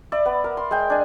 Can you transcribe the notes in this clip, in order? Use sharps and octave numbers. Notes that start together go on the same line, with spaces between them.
D5 E5
B3
A#4
C6
G#3 G5
D4 G#5